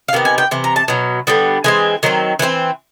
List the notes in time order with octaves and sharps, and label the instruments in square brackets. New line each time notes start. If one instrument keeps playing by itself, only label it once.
[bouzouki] F5
C3 D#3 B3
G#5
G5
C3 E3
A#5
A5
B2 F#3
D3 G3 B3
E3 G#3 C4 G#5
D#3 F#3 C4
E3 A3 C4